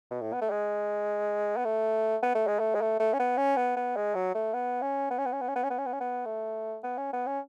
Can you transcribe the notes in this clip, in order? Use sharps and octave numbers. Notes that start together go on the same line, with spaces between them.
B2
A2
B3
A3
G#3
B3
A3
B3
A3
G#3
A3
G#3
A3
A3
C#4
B3
C#4
B3
B3
G#3
F#3
A3
B3
C#4
B3
C#4
B3
C#4
B3
C#4
B3
C#4
B3
C#4
B3
C#4
B3
A3
B3
C#4
B3
C#4